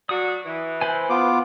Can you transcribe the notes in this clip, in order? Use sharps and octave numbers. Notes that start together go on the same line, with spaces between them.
F#3 F#4 D5 D#6
E3
B4 C5 G#5
B3 F4 D6